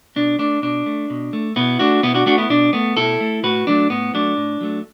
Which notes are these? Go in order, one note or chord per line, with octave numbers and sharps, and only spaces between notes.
B2 D4
A3 D4
B2 D4
A3
B2
A3
B2 B3 E4
A3 D4 F#4
B2 B3 E4
D4 F#4
A3 D4 F#4
B3 E4
B2 D4
A3 B3
B2 E4 A4
A3
A2 F#4 B4
F#3 A3 D4
A2 B3
F#3 A3 D4
A2
F#3 A3